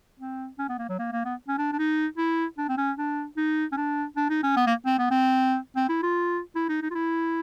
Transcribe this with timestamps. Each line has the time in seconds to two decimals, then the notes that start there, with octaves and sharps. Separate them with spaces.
0.19 C4
0.59 C#4
0.69 B3
0.78 A#3
0.89 F#3
0.99 A#3
1.12 A#3
1.25 B3
1.48 C#4
1.58 D4
1.73 D4
1.78 D#4
2.17 E4
2.58 D4
2.69 C4
2.78 C#4
2.97 D4
3.37 D#4
3.72 C#4
3.77 D4
4.17 D4
4.30 D#4
4.43 C#4
4.57 B3
4.67 A#3
4.86 C4
4.99 B3
5.11 C4
5.76 C4
5.89 E4
6.03 F4
6.55 E4
6.69 D#4
6.82 D#4
6.91 F4
6.95 E4